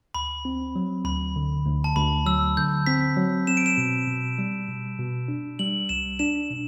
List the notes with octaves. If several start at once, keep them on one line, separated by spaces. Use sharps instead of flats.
D2 B5
C4
F#3
D2 B5
D3
D2
A5
D2 B5
F#3 E6
D3 G6
C4 B6
F#3
C4 E7
D7
E7
B2
B2
G3
B2
B2
D4
G3 F#7
C2 E7
D4 E7
B2